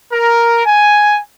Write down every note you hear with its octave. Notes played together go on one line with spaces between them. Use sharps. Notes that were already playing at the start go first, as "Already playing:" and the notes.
A#4
G#5